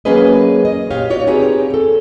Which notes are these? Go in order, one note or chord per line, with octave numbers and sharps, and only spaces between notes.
F#3 A#3 C#4 G#4 B4 D#5
D#5
A#2 G4 C#5 F5
B2 F4 F#4 C#5 D5
C4 D#4 G4 G#4 B4 C#5
C4 A4